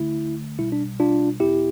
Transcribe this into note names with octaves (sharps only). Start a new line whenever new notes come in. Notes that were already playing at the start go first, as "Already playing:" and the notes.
Already playing: D2 D3 A3 E4
B1 B2 G3 E4
D4
D4 F4
E2 B2 B3 E4 G4